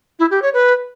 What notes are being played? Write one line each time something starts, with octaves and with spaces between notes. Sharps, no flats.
E4
G4
C#5
B4